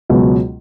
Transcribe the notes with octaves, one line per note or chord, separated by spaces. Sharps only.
C#2 B2 F#3 B3